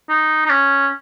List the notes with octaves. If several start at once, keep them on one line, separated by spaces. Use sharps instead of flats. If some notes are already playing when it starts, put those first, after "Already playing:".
D#4
D#4
C#4